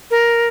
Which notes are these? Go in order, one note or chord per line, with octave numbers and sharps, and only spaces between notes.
A#4